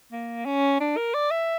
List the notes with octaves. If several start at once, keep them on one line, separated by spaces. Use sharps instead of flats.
A#3
C#4
D4
A#4
D5
E5